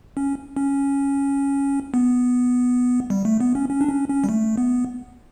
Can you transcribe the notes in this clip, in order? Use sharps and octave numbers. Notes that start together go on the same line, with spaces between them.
C#4
C#4
B3
G3
A3
B3
C#4
C#4
D4
C#4
C#4
G3
A3
B3